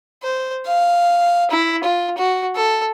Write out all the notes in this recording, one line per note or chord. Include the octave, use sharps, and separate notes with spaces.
C5
F5
E4
F4
F#4
A4